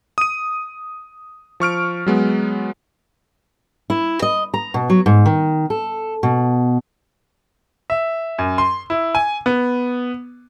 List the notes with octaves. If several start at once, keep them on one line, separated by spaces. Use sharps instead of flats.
D#6 D#7
F3 C#6 F6 D7
F#3 G#3 B3
E4
D#5
A#5
B2
F#3
G#2
D#3
A4
B2
E5
F#2
C6
E4
G#5
B3